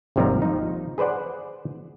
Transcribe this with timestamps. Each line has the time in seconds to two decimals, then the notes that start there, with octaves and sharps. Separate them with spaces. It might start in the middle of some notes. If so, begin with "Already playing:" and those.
0.16 G#1 D#2 C3 F3 G3 A#5
0.42 F3 D#4
0.98 G#4 B4 C5 D5 F#5